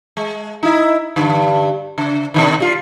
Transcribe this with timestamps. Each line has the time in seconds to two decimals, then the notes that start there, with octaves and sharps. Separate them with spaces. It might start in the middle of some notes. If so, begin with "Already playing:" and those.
0.17 G#3
0.63 D#4 E4
1.16 G2 D3
1.98 C#3
2.34 B2 D3 D#3
2.60 G3 F4